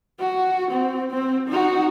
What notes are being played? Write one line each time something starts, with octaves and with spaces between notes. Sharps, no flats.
F#4
C4
C4
D#4 F#4